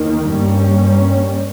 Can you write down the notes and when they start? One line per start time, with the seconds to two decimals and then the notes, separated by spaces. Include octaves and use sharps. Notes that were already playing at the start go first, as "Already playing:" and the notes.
Already playing: D#2 D#3 A#3
0.29 G2 G3 A#3 C#4